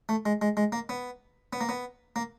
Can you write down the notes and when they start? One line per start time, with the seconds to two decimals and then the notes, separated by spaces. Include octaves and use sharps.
0.09 A3
0.26 G#3
0.42 G#3
0.57 G#3
0.72 A#3
0.89 B3
1.53 B3
1.61 A#3
1.69 B3
2.16 A#3